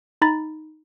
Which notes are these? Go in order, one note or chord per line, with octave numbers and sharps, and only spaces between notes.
D#4 A#5 B5 A6